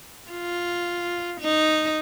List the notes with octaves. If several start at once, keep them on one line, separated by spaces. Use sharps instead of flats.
F4
D#4